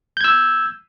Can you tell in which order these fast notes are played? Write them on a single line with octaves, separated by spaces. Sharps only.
G6 G#6 E6